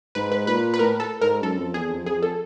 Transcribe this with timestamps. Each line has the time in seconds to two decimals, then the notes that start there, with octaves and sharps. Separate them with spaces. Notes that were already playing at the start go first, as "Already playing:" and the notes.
0.15 G#2 B4
0.32 B4
0.47 A#2 B4
0.74 B4
0.79 A2 A#4
1.00 A4
1.21 G#2 A#4
1.42 F#2 A4
1.58 F2
1.74 E2 G#4
1.91 F2
2.06 F2 G#4
2.23 A4